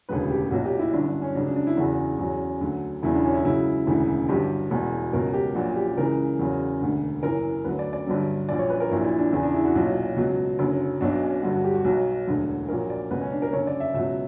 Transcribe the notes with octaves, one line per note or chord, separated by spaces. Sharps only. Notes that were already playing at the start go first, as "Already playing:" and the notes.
E1 D2 C#3 F#3 B4
G4
B1 A#2 F#3 F#4
G4
E4
G1 F#2 D3 D4
D4
C#4
C#2 C#3 F#3 D4
D4
D4
E4
F#1 E2 C#3 F#4
E2 C#3 F#3
D2 D3 F#3
E1 E2 C#3 F#3 E4
D4
C#4
E4
C#2 C#3 F#3 E4
E1 D2 C#3 E3
G1 G2 F#3 G4
E1 E2 B2
C#2 B2 F#3 A#4
G4
A#1 A#2 F#3 F#4
F#4
G4
C#2 C#3 E3 A#4
E2 C#3 F#3
E1 D2 D3
F#1 F#2 E3 A#4
D2 D3 F#3 B4
D5
D5
G1 G2 F#3
A#1 A#2 F#3 D5
C#5
B4
A#4
A#1 A#2 F#3 E4
E4
D4
E2 C#3 E3
D4
E4
F#4
B1 A#2 F#3 F#4
C#2 B2 F#3
F#1 F#2 D3 F#3
B1 B2 F#3 D4
C#4
G1 G2 D3 F#3 F#4
F#4
G4
F#4
B1 B2 F#3
E1 D2 D3 F#3
A#1 A#2 F#3 A#4
D5
C#2 B2 F#3 B4
C#4
D4
A#4
F#1 F#2 D3 C#5
D5
E5
C#2 B2 F#3 E5